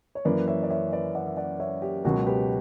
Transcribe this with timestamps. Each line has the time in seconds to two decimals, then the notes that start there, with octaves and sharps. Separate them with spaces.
0.15 C#5
0.25 F#2 E3 A#3 B4 D5
0.48 C#5 E5
0.63 D5
0.70 C#5 E5
0.93 B4 D5
1.15 D5 F#5
1.27 E5
1.37 D5 F#5
1.60 C#5 E5
1.82 G4
2.04 C#2 B2 F#3 F#4 A#4
2.26 G4 B4